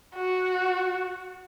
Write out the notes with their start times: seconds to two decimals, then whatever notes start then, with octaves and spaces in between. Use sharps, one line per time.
0.15 F#4